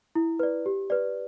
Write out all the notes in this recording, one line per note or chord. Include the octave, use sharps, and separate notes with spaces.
E4
B4 D5
G4
B4 D5